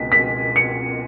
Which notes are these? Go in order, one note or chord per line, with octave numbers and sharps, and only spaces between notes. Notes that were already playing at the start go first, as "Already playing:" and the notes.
Already playing: C#2 B2 G#3 B6
B6
C#7